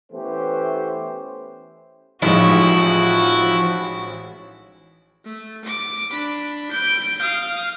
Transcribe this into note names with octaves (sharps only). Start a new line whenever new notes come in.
E3 A3 B3 C#4 G4 C5
A1 F3 G#3 D#4 E4 F#4
A3
D6
D4 B5
G6 D7
F5 D#6